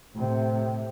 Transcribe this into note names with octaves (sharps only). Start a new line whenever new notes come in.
A2 C3